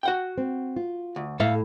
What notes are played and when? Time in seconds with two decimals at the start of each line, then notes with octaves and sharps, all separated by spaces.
0.03 F#4 F#5 G5
0.38 C4
0.76 F4
1.16 D2
1.40 A2 A4 E5 F5